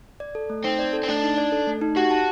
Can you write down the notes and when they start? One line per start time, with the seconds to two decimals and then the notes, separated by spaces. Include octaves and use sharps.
0.20 D5
0.35 A4
0.50 A3
0.65 C4 D#4
0.79 D5
0.93 A4
1.03 C4
1.08 A3 D4
1.23 D#4
1.37 D5
1.52 A4
1.67 A3
1.81 D#4
1.96 F#4 G4
2.11 A5